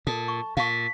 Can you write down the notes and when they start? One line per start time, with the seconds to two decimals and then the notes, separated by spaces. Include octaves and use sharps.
0.07 A#2 A4 A5
0.28 C#6
0.57 A#2 F5 A5 C#6 B6